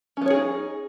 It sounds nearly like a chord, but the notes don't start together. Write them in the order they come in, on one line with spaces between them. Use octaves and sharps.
C#4 B3 C#5 G#4 D#4